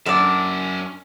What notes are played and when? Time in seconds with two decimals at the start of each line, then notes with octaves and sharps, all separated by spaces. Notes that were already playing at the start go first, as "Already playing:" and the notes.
0.06 F#2 C#4 D5 A5